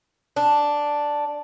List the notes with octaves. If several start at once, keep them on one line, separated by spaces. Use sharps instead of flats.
D4